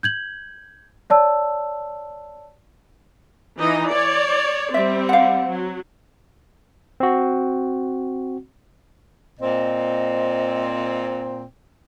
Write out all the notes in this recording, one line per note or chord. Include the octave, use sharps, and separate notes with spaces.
G6 G#6 F#7
C#5 D5 A5 E6
E3 D#4 D#5
C#5 D5
G3 C4 D5 E5
F5 F#5
F#3
C4 F#4
A#2 C4 D#5